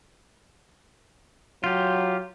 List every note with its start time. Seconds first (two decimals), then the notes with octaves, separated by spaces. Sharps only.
1.64 F#3 F4 G4